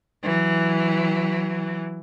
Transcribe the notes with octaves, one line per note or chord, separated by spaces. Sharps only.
E3 F#3